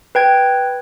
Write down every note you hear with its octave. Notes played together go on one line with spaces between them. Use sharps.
B4 G5 G#6